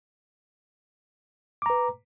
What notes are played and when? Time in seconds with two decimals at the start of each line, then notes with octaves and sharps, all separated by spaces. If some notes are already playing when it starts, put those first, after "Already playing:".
1.62 D6
1.66 A#5
1.70 B4